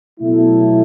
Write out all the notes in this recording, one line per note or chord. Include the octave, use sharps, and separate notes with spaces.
B2 F#3 A3 E4